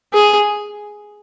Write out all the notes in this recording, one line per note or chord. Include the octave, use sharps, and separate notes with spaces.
G#4